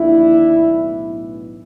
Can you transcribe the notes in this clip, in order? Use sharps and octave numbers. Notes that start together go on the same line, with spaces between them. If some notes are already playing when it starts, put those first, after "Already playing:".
Already playing: D#2 D3 F3 D4 E4
B1 A2 E3